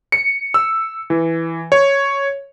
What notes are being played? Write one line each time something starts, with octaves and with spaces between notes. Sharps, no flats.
C#7
E6
E3
C#5